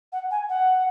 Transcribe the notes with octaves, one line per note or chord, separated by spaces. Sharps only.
F#5
G#5
F#5